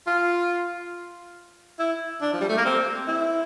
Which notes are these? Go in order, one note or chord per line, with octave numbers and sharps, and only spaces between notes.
F4
E4
D4
F3
G3
A3
A#3
C4
E4